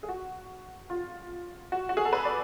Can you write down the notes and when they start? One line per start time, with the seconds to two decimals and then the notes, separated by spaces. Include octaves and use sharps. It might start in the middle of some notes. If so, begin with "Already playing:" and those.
0.03 G#4
0.09 F#4
0.90 F4
1.72 F#4
1.89 F#4
1.97 G#4
2.05 A4
2.13 B4
2.25 D5